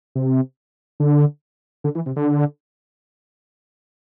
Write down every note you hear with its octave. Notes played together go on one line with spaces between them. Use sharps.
C3
D3
D3
E3
C3
D3